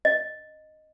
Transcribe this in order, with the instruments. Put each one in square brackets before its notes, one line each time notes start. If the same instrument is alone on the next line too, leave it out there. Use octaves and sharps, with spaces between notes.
[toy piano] D#5